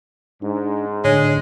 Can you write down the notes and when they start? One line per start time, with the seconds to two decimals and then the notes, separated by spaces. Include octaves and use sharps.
0.42 G#2 D4
1.05 A2 D3 G#3 D4 C#5